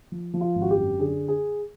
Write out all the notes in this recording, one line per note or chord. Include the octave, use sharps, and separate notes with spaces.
F3
F3
F4
G#1
F#4
G4
F#2
D3 G#4
G#4